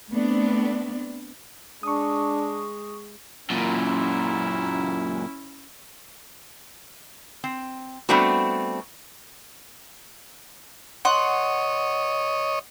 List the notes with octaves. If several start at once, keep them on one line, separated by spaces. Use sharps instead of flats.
A3 B3 C4 D4
G#3 D4 C#6 D#6
F#2 A#2 C#4 E4
C4
G3 A3 B3 C4 D4 F#4
C#5 D#5 F#5 C6